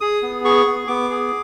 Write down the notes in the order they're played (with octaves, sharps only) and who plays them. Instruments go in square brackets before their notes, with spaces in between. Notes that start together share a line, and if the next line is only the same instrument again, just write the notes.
[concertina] G#4 D#6
B3
G#4 C#6
B3
B3 D6
G#4